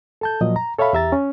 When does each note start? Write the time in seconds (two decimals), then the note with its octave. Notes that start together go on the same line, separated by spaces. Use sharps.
0.21 A4 A5 G6
0.41 A#2 F3 F#3 D#5
0.56 A#5
0.78 A4 C#5 E5 F5 B5
0.93 E2 G4 E5 A#5 A6
1.12 C#4